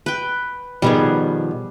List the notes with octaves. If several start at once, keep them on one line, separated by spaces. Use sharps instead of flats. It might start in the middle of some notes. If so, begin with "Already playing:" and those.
B4 G5
B2 D#3 F3 G3 B3 G#4